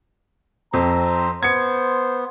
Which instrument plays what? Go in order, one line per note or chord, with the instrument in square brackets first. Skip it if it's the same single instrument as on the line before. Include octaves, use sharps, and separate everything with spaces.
[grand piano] F2 [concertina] C4 C5 [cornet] A#5
[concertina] B3 [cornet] C5 [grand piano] G#6 C#7